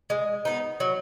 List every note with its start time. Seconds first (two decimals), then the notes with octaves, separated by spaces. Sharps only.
0.10 G#3
0.45 B3 D#4
0.80 F#3